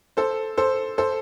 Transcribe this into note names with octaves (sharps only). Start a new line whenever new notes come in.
A4 C5
A4 C5
A4 C5